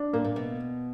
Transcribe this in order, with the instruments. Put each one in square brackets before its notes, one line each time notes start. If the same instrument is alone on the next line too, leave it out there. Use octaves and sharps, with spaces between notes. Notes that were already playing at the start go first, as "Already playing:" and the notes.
Already playing: [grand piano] D4
[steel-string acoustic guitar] A#2 [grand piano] A#3
[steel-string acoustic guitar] A#2
B2